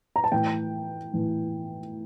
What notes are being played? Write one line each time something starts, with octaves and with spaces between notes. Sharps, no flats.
A#5
A5
A2 E3 G5
A2 E3